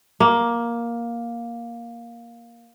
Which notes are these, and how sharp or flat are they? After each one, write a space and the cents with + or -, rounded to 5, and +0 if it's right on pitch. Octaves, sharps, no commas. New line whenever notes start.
A#3 +10